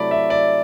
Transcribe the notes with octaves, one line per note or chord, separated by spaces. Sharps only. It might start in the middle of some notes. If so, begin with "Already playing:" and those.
Already playing: C3 F#3 A3 E4 D5 B5
E5
D5